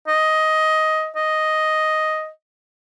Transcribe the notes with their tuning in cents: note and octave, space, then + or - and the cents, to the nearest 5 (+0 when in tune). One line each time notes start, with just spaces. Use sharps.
D#5 +10
D#5 +0